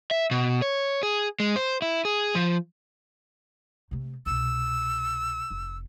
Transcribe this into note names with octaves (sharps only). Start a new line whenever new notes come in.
E5
B2
C#5
G#4
G#3
C5
E4
G#4
F3
C3 A3
C2 B2 E6
F1